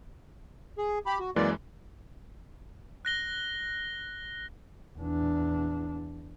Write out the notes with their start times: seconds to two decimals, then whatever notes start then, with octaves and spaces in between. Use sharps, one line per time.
0.78 G#4
1.06 G4 B5
1.19 F#4
1.36 F#2 E3 G#3 A#3 D5
3.05 F#6 A#6 G7
4.98 E2 D4